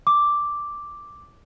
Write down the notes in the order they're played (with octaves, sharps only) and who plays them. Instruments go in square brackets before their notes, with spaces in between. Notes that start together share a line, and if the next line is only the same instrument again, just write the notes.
[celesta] D6